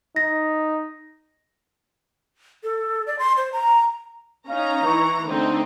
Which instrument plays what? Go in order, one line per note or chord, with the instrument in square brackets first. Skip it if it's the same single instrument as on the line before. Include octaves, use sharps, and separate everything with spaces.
[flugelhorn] D#4 [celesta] A#6
[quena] A4
D5
C6
C5
A#5
[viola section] C#4 D#4 [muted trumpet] F5 [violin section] A#5
[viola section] E3 [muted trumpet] C#6
[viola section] D3 A3 [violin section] C4 D#4 [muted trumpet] C5